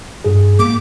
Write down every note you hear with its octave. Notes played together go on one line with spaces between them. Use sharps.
G2 G#4
G#2 A#3 D6